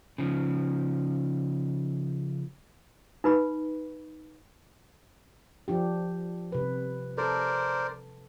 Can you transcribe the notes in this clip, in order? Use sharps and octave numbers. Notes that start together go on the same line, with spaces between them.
C#3 F3
D#4 B4 B5
F3 D4 G4
C3 B4
A4 A#4 C5 D5